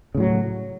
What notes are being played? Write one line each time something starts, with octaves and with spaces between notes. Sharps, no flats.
A2 C#3 F#3